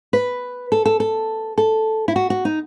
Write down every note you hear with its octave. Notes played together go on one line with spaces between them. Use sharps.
B4
A4
A4
A4
A4
E4
F#4
F#4
D#4